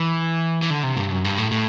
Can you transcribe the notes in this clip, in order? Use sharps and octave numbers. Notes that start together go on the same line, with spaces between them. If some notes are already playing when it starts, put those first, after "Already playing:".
Already playing: E3
E3
D3
C3
G2
F#2
G2
A2
A2